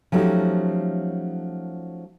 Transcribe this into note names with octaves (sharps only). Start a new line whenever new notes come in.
F3 F#3 A3 C#4 D#4 G4